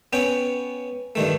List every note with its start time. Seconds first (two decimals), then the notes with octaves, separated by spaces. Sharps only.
0.13 B3 C#4 G5
1.15 G2 D#3 A3